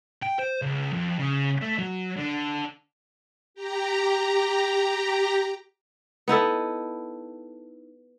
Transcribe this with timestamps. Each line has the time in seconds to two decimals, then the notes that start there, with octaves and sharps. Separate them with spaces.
0.23 G5
0.39 C5
0.62 C#2
0.92 F2
1.18 C#3
1.61 A3
1.79 F#3
2.17 D3
3.54 G4 A#5
6.28 B3 D#4 E4 A4